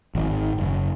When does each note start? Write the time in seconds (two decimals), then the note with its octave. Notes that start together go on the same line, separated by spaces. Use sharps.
0.15 G#1
0.58 F#1